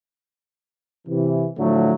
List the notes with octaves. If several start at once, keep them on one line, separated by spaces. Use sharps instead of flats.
C3 E3
A2 D3 F3 F#3 A3